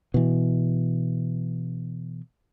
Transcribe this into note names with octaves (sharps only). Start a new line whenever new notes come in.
B2 E3